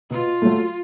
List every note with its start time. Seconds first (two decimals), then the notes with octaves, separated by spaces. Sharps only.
0.11 B2 F4
0.42 F#3 A3